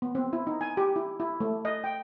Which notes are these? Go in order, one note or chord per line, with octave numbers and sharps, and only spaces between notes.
B3
C4
E4
D#4
G#5
G4
E4
E4
A3
D#5
G5